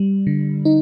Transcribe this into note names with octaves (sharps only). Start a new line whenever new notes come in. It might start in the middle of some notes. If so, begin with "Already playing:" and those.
Already playing: G3
D3
D#4